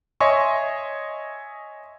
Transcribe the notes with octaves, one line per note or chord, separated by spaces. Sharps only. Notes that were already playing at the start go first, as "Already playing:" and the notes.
C#5 D#5 E5 G#5 C6 C#6